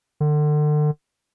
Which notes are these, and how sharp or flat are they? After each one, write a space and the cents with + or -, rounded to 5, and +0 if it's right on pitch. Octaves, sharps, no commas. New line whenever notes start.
D3 +35